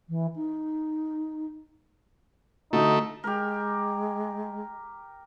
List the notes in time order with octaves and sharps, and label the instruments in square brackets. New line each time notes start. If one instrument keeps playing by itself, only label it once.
[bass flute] E3
D#4
[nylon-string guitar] D3 F#4 [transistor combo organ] A3 [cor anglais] D#4
[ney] G#3 [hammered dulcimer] G4 A#4